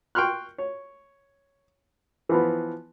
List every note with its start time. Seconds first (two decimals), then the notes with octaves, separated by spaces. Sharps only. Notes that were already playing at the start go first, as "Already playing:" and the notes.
0.15 G5 C6 C#6 F6 F#6
0.58 C#5
2.29 E3 F3 B3